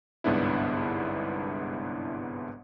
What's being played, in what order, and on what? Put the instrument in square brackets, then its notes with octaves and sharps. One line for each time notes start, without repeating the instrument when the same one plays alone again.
[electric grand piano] G1 C2 G#2 B3 D4 E4